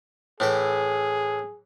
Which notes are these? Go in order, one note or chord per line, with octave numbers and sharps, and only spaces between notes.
A2 E3 G#4 G5